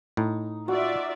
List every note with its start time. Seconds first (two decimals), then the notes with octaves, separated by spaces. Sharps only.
0.17 A2 D#4
0.68 F4 F#4 D5 E5